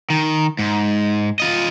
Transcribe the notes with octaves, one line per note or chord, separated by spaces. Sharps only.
D#3
G#2
F4 D#5